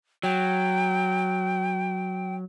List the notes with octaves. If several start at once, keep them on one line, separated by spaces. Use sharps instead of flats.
F#3 G5